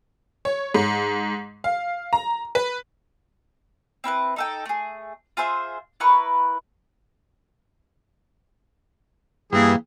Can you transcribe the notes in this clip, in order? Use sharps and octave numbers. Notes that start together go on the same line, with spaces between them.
C#5
G#2
F5
A#5
B4
C4 E4 A#4 B4
D#4 A4 G5
A3 G#4
F4 G#4 C5 E5
E4 A#4 B4 C#6
G2 E3 A#3 G#4